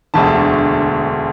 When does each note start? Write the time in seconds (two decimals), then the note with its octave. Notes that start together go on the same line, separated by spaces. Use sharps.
0.14 E1 D2 D3 A5